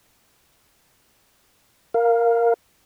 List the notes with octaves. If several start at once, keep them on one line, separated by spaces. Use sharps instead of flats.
A#4 F5